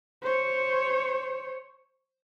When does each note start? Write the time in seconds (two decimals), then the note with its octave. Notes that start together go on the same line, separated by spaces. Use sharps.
0.22 C5 C#5